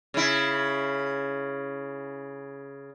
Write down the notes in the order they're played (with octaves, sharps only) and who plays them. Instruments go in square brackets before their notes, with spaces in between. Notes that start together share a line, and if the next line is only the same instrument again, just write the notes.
[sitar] C#3 E4